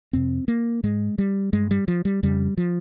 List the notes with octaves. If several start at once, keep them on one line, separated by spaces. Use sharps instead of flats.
F2 C3 C4
A#3
G#2 G#3
G3
G2 G#3
G3
F3
G3
F2 C#3 G3
F3